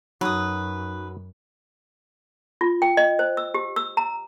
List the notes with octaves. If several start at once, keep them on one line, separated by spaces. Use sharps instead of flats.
F#2 F#3 D#4 F#4 B4 D#6 F#6
F4
G5
D#5
C5
E6
G4
E6
A#5